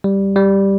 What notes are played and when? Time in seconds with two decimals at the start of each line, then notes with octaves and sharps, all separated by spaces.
0.04 G3
0.36 G3